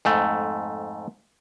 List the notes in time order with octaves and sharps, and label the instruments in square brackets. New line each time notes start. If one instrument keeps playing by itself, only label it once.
[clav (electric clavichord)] F2 G#2 A3